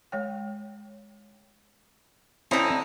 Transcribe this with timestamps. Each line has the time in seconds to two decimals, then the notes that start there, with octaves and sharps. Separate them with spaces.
0.12 G#3 C#5 G5
2.51 D3 C4 C#4 D#4 E4